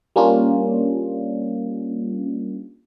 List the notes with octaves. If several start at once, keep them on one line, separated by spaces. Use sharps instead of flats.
G3 A#3 C#4 D4 F4